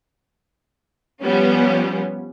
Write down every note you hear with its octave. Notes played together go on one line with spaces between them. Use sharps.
F3 G3 B3 C#4